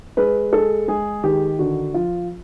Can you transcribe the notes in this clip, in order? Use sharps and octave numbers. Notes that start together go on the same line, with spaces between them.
G#3 B4
G#3 A4
G#3 G#4
D#3 G4
D3 F#4
F3 F4